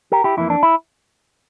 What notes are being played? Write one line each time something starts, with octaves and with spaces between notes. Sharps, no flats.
G4 A#4
E4 G4
F2 E3 A#3 E4
D4
E4